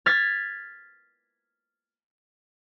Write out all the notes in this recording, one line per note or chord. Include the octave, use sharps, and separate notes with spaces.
F6 G#6 A6 B6